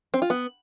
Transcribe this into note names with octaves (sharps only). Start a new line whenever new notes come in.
C4
F4
B3